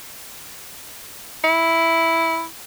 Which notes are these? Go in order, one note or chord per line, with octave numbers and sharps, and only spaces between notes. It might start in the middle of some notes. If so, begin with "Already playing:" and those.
E4